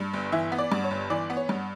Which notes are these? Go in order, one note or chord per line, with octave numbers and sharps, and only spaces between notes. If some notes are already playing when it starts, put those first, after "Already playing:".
Already playing: G2
G1
E3 E5
B3
D5
G2
C#5
G1
E3 D5
B3
C#5
G2